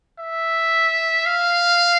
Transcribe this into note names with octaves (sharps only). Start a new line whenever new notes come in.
E5
F5